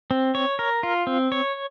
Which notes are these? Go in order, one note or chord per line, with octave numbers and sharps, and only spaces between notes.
C4
C#5
A#4
F4
C4
C#5